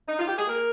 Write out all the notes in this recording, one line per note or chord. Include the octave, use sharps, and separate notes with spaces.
D#4
F4
G4
G#4
A#3 A#4